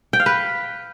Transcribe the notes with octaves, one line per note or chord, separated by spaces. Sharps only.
G5
F5
B4